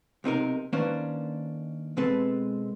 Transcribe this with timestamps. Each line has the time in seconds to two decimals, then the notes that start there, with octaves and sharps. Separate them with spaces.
0.24 B1 C3 D#4 A#4
0.73 D#3 A#3 C#4 D4 B4 C5
1.97 B2 G#3 C4 A4 B4